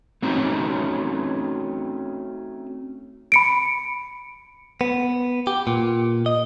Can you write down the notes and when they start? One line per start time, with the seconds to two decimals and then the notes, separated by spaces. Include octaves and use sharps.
0.22 A3 C4 C#4 D#4 F#4
3.32 B5 C#7 D7
4.81 B3
5.47 G4
5.67 A#2
6.26 D#5